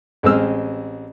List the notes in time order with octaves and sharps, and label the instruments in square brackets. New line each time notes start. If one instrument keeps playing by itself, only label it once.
[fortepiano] A1 G#3 C4 E6 F6